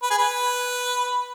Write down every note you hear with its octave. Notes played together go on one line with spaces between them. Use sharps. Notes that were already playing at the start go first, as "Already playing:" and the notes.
B4
G#4
B4